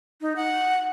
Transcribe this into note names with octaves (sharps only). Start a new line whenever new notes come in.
D#4
F#5